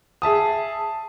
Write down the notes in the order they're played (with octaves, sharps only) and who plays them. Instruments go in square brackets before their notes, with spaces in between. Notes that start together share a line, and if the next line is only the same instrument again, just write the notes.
[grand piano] G#4 E5 A5 D#6